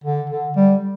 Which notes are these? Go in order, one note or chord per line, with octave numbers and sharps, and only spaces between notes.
D3
D3
G3